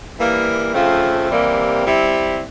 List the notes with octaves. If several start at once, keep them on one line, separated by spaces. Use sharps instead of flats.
E3 G3 A#3
C#3 F3 A3 C4 F4
C3 E3 G3 A#3
G3 C4 E4